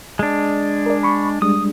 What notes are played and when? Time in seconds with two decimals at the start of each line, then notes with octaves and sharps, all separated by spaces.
0.19 G#3 D4
0.86 A#4 D5
1.03 B5 C#6
1.42 G3 G#3 D4 D#6